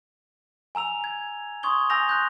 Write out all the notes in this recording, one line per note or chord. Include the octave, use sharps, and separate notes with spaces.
G#5 A#5 E6 F7
A#5 G#6
C6 C#6 D#6 G#6 G7
G#5 E6 G6 A#6 F7
C6 F#6 G6